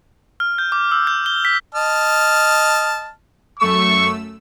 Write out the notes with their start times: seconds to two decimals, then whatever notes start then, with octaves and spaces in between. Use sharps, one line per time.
0.40 F6
0.58 G6
0.72 D6
0.92 E6
1.07 G6
1.26 G7
1.45 B6
1.75 D#5 A5 F6
3.60 F#2 A3 C#6 E6